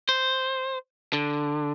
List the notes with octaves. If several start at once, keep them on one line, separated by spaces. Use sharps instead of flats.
C5
D3